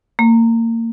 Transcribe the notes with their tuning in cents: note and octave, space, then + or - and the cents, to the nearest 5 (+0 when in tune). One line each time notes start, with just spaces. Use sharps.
A#3 -30